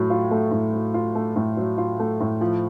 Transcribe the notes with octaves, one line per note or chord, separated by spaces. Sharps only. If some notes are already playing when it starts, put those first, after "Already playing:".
Already playing: A2 F#3 A3
F4
A3
A2
F#3
F4
A3
A2
F#3
F4
A3
A2
F3